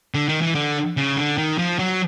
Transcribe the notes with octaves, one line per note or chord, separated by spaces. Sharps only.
D3
D#3
E3
D3
C#3
D3
D#3
F3
F#3